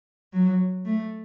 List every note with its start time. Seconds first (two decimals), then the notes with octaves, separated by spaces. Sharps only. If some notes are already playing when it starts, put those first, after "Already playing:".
0.33 F#3
0.86 A3